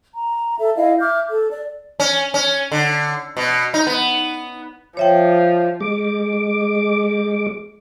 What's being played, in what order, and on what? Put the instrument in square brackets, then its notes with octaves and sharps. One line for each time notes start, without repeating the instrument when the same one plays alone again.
[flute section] A#5
A4 E5
E4 D#5 F5
E5 D6 F6 G6
A4
D5
[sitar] C#4
C#4
D3
B2
D#4
B3
[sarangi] F3 [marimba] C#5 E5 G5
[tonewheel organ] G#3 D6